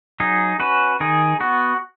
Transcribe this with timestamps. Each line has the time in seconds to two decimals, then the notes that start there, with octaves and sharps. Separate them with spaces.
0.20 F#3 D#4 G#4
0.60 C#4 F#4 B4
1.00 D#3 D#4 G#4
1.40 B3 F#4